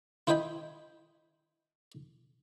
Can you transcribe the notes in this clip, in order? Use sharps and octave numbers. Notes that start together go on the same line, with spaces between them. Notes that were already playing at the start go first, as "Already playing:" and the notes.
E4 C5 D#5 G5 G#5 B5